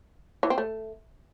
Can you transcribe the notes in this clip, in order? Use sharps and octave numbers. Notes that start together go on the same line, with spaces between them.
E3
C4
A3